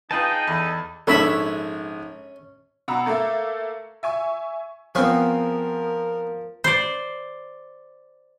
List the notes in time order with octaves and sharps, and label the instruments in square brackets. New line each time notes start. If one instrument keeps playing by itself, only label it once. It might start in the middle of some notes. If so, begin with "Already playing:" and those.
[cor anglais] D#4 [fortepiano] F4 B4 [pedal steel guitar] G#4 D#5 A5 [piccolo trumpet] G5
[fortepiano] E2 [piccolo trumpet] A4
[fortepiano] A#1 G#2 [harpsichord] C#4 C#5 E5 [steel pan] A4 B5 E6
[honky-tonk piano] B2 F#5 A#5 B5 E6
A3 A#3 A4 E5
E5 G#5 C#6
[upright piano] F3 [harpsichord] B3 C4 [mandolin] G#4 C#6 F6 [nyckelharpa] A#4
[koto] C5 D5